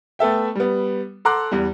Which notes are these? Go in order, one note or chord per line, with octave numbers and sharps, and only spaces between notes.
A3 B3 A4 E5 G5
G3 B3
A4 F#5 A#5 C6 D6 F#6
E2 G3